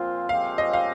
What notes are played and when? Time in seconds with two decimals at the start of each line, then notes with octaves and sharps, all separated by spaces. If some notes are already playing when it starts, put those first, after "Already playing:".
Already playing: A#2 F3 C4 F4
0.29 A#2 F3 G#3 C4 G4 F5
0.58 D#5
0.73 F5